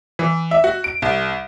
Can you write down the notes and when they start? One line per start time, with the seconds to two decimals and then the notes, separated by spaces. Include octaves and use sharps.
0.19 E3
0.51 E5
0.64 F#4
0.84 D7
1.02 C2